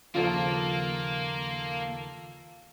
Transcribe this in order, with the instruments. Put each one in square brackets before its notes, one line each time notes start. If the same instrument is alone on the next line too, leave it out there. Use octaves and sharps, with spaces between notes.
[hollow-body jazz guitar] D#2 C#3 F3 [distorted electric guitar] A#3 [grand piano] F4 A4 F5